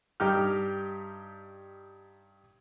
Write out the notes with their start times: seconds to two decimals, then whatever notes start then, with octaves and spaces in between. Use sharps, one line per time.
0.20 G2 G3 D#4 G4 G5 F6